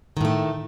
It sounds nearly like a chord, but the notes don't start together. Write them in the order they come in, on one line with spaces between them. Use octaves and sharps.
D#3 A2 A3